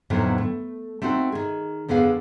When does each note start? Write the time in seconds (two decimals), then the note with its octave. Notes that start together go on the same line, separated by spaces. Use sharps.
0.10 F2 A2 D3 D#3 F#3 B3
0.38 A3
1.02 A3 C4 D#4 F#4
1.32 D#3 G#4
1.88 F2 D3 B3 G#4 F5